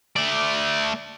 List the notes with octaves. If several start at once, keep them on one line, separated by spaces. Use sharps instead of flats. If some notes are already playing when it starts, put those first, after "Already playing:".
A3 D5